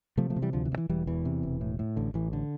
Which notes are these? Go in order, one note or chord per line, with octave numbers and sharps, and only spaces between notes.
C3 F3 A3
F3 A3
C3
E3 G3
D2 D3 F3
E3
D2
E3
E1 E3 G3
E2 E3
C3
E1
A2
A2
A1 D3
A1 E3
D3